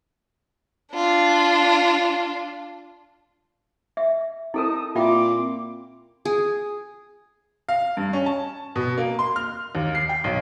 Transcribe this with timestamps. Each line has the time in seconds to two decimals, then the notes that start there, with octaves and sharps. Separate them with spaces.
0.93 D4 F4
3.97 E5
4.54 C4 D#4 E4 A4 A#4 A5 D#6
4.96 A#2 F4 E5 G5 C6 D6
6.25 G#4
7.69 F5
7.97 G2
8.13 C#4
8.26 A5
8.76 B2
8.98 A#3
9.19 C6
9.36 F6
9.75 D#2
9.95 C7
10.09 G5
10.24 B1